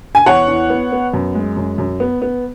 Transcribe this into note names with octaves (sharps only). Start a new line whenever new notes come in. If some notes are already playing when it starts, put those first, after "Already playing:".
G#5
E2 C#5 F#5
E2
B3
B3
F#2
G#3
F#2
F#2
B3
B3